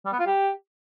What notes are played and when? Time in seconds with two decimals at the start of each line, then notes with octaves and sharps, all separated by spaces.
0.06 G3
0.13 B3
0.20 F4
0.26 G4